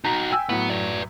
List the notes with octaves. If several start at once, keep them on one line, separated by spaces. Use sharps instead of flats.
D#4 F#4 A#5 B6
G5 G#5 E6
A2 F#3 B3
B4 D5